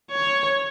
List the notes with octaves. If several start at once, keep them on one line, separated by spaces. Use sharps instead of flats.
C#5